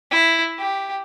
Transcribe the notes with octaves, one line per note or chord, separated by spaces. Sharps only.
E4
G4